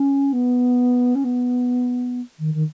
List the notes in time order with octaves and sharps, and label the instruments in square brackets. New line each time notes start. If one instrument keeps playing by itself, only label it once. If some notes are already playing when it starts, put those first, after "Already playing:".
Already playing: [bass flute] C#4
B3
C#4
B3
D#3
D#3